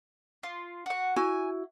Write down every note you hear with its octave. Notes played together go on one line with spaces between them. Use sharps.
F4
F#4 F#5
E4 F#4 G#5